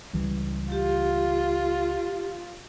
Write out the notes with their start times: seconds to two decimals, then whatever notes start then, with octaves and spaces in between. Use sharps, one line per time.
0.13 C#2 E3 G3
0.72 F4 G4